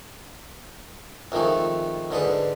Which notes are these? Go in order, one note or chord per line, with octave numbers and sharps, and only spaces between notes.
F2 D#3 G#3 A3
G#2 D3 G#3 B4